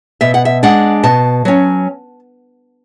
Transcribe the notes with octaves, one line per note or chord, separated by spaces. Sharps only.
B2 E5
F#5
E5
G#3 D4 F#5
B2 A5
F#3 C#4